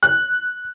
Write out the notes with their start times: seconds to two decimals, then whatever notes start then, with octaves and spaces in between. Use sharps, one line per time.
0.03 F#6